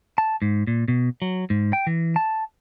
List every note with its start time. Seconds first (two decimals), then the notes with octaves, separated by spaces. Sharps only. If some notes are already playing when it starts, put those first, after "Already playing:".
0.18 A5
0.42 G#2
0.67 A#2
0.88 B2
1.22 F#3
1.50 G#2
1.73 G5
1.87 E3
2.16 A5